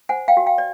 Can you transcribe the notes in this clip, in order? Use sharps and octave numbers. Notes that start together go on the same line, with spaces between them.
C5 F#5 G#5
F5 G5
F#4
F5 G5
D5